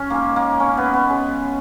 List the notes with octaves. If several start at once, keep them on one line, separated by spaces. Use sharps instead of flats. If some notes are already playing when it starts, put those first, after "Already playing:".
Already playing: C#4
D#3 G#3 A#3
A#3
C#4
B3
B3
C#3 G#3